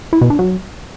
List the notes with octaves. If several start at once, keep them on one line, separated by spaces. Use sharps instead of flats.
E4
B2
D4
F#3